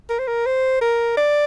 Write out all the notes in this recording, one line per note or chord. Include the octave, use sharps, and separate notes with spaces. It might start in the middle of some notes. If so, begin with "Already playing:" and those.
A#4
C5
A#4
C5
A#4
D5